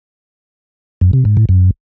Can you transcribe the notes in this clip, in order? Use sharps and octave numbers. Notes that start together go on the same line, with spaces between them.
F#2
C3
G#2
A2
F#2